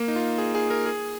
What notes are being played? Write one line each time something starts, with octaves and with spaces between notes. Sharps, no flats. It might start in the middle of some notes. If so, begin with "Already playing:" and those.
Already playing: A#3
D#4
F4
G#4
G#4
A#4
G#4